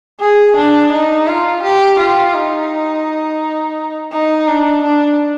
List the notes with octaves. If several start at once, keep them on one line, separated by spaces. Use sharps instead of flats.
G#4
D4
D#4
F4
G4
F4
D#4
D#4
D4
D4